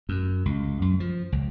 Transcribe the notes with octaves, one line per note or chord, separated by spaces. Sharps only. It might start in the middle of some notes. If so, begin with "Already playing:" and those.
F#2
C#2
F#2
F3
C#2